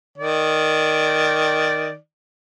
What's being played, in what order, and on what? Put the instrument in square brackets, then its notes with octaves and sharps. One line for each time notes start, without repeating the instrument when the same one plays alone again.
[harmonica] D#3 D5